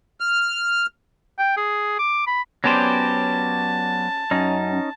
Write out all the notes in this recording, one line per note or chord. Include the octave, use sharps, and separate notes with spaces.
F6
G5
G#4
D6
B5
F#3 B3 C#4 G4 C5 D5 A5
F#2 C#4 D#4